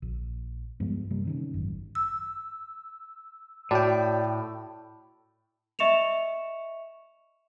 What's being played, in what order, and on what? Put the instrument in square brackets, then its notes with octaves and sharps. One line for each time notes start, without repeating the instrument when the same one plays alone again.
[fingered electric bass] A#1
G2 F3 G#3 B3
C3 G3 A#3
C3 D#3 C#4
G#1 F#2
[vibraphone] E6
[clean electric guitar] A2 [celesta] F#4 C#5 [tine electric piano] D5 G5
[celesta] D#5 E5 C#6 C#7 E7 F7